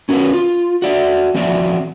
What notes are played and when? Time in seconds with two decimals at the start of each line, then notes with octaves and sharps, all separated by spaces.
0.09 C#4 F#4 G#4 A#4 B4
0.33 F4
0.82 F#4 D5 E5
1.34 E3 F3 C4 F#4 D5 E5